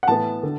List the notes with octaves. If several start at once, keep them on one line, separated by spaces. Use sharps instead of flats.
F#5
A2 E3 B3 A5
D3